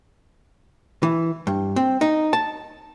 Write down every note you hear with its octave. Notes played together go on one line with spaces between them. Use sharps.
E3
G2
C4
D#4
A5